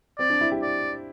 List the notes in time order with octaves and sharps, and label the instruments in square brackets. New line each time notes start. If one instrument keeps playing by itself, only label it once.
[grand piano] C4 [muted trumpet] D5
[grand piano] D4
E4
G4
[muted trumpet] D5